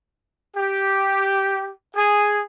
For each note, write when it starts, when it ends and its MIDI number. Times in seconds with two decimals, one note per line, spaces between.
0.57 1.72 67
1.96 2.41 68